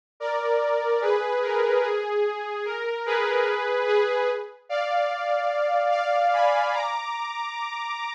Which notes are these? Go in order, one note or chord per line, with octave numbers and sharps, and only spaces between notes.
A#4 D5
G#4 B4
A#4
G#4
A#4
G#4 B4
G#4 B4
D5 F5
D5 F5
G#5 B5
A#5 D6